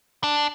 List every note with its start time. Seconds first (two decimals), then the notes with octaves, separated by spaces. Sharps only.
0.23 D4